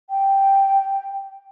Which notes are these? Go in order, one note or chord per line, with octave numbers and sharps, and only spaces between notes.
G5